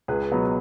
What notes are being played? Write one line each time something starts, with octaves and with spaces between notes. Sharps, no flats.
C#2 G#4 B4
B2 F#3 B3